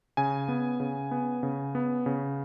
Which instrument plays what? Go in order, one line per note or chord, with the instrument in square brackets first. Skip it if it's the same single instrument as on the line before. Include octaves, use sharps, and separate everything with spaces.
[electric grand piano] C#3 G#5
B3
C#3
B3
C#3
B3
C#3